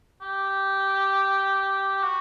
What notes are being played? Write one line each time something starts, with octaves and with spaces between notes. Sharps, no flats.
G4
F#4